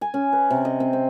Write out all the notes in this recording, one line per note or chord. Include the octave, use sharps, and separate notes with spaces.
G#5
C#4
B4
C3
D#5
C4
C4